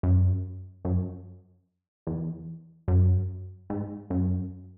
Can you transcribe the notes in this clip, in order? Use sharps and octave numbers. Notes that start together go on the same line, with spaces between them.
F#2
F#2
E2
F#2
G#2
F#2